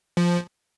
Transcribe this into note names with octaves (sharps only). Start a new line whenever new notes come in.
F3